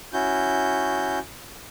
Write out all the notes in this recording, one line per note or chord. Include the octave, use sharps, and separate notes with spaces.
C#4 E4 F#4 G6